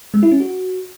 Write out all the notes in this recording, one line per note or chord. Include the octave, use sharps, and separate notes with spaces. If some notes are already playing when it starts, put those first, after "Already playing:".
G#3
E4
C#4
F#4